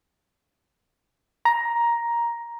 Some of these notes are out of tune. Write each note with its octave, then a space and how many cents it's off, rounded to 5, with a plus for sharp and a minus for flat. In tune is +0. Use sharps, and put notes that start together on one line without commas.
A#5 +10